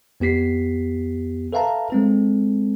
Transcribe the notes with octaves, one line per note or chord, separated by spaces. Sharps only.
F2 B3 G4 B6 C7
A4 B4 E5 F5 A5 A#5
G#3 C4 A4